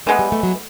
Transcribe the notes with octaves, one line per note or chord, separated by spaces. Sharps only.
E3 G#3 A3 B3
G3
A3
F#3